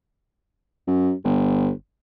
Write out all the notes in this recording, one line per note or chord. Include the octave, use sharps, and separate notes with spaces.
F#2
G1